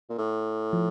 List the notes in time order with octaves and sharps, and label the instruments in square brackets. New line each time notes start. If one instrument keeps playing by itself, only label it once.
[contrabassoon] A#2
A2
[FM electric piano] F3